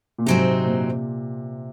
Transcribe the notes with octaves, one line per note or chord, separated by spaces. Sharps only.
A#2
G#2 C3 F#3 C4 D#4
A#2